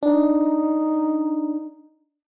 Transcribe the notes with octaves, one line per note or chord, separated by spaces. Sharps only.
D4 D#4